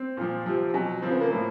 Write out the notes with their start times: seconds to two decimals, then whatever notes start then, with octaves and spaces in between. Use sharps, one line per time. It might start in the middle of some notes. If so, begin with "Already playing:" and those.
Already playing: C4
0.17 A#2 F3
0.46 C3 F3
0.74 B2 F#3
1.02 C#3 F3 C4
1.11 B3
1.21 A#3
1.31 A2 F3